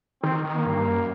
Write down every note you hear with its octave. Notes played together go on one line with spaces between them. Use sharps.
D#3 C4
D#3
A#3
G2
F#2